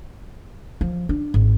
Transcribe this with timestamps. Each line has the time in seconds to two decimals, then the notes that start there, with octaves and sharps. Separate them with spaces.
0.81 F3
1.09 D4
1.34 G#1